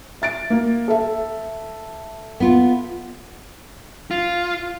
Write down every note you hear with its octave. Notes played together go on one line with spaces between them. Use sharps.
E5 A6 D7
A#3
A4 E5
B3 F4
F4